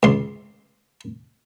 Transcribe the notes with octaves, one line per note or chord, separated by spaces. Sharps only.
C#2 C6